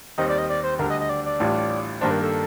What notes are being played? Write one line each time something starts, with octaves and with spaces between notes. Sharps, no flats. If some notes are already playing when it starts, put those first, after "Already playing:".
D#2 D#3 G3 C4 D#4 D#5
D5
D#5
D5
C5
D2 D3 G3 D4 A#4
D#5
D#5
D5
D5
A1 A2 G3 D4 F4
G2 D#3 A#3 D4 C5
A#4
A4